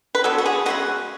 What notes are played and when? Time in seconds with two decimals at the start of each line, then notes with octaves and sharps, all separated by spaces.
0.15 B4
0.24 D3 F#3 B3 A4
0.38 F#4
0.46 G#4
0.66 C#3 G#3 B3 F#4